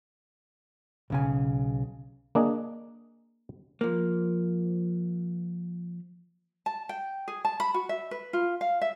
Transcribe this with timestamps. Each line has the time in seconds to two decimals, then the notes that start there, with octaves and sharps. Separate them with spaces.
1.10 B1 C#3 G#5
2.35 A#3 D4 G#4 D#5
3.81 F3 A#3
6.66 A5
6.89 G5
7.28 G#4
7.45 A5
7.60 B5
7.74 F#4
7.89 E5
8.11 B4
8.33 F4
8.61 F5
8.81 E5